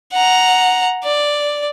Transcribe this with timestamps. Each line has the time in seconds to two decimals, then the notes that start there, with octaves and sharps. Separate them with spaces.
0.13 F#5 A#5
1.04 D5